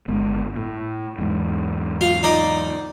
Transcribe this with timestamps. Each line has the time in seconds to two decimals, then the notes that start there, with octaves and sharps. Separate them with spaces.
0.08 G1 G#3 B3
0.56 A2
1.19 E2 G#2
2.01 F4 F5
2.23 D#4 D5 D#5